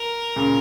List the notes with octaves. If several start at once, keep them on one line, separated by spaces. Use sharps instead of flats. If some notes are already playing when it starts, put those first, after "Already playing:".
Already playing: A#4
A#2 C#3